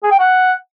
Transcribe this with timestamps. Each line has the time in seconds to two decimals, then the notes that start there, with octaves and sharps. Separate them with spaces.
0.03 G#4
0.11 G5
0.20 F#5